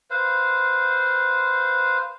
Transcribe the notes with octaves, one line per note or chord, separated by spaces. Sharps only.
B4 C5 F5